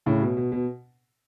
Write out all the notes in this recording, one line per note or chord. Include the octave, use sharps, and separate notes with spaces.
A2 C#3
B2
B2
B2